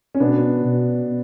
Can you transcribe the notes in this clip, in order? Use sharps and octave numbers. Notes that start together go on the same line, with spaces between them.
C#4
B2 B3 D4
B2